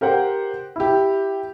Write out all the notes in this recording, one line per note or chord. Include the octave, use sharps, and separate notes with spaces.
G4 A#4 C5 F#5 G5
E4 G4